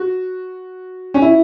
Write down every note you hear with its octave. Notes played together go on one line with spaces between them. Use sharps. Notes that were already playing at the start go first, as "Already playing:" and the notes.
Already playing: F#4
C#4
E4